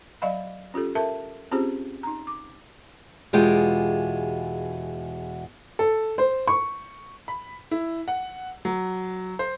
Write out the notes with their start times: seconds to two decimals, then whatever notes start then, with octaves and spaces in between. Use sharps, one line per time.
0.22 F#3 D5 D#5 F5 B5
0.74 C#4 F4 G4 A4
0.95 A4 A#4 E5 A5
1.51 C4 C#4 F4 G4 G#4 C5
2.03 D#4 A#5
2.27 D6
3.33 E2 B2 G#3 F4 G4 G5
5.79 A4
6.18 C5
6.47 C#6
7.28 B5
7.71 E4
8.08 F#5
8.65 F#3
9.39 C5